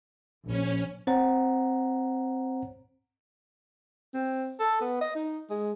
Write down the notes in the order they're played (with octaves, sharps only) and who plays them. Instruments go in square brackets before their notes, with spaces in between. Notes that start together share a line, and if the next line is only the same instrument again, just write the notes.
[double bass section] A#1 [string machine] C#4
[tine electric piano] C4 C5 C#5 F#5 A#5
[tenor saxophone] C4
A4
B3
D#5
D#4
G#3